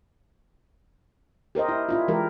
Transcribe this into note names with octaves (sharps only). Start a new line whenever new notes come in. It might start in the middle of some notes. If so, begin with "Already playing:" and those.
G4 A#4 C5 D#5
E4
D4 E4 F4
E3 G#3 G4 A#4